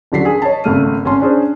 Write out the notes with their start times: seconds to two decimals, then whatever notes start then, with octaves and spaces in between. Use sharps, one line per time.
0.12 D#1 D3 F#3 B6 C7
0.25 G#4
0.42 C#5 D#5 A5
0.64 G#1 C#3 A3 F6 D#7
1.05 G#1 C#4 A5 C6
1.20 C#4 D4 G#4 C5